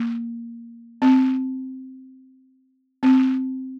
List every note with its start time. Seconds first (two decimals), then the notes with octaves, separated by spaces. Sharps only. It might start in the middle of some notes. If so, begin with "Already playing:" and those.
Already playing: A#3
1.02 C4
3.03 C4